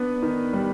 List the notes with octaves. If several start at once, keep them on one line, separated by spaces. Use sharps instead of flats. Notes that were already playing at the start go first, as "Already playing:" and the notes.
Already playing: B3 D4 B4
D#3
G3